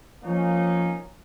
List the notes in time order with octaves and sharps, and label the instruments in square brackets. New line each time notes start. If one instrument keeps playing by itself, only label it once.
[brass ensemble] F3 A#3 C#4 D#4